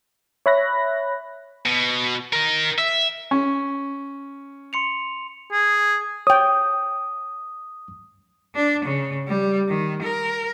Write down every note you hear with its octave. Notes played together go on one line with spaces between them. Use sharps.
C#5 E5 B5 F#6 A#6
B2
A#4 D#5
E5
C#4
C6 C#7 F7
G#4
C#5 G5 D#6
D4
C#3
G3
D#3
A#4